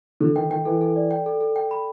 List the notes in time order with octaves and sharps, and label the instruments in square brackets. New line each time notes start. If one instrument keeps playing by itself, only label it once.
[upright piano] D3 [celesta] A4
[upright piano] D#3 [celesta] G5
[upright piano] D#3 [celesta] G5
[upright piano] E3 [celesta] A4
[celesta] A4
D5
G5
A4
A4
G5
B5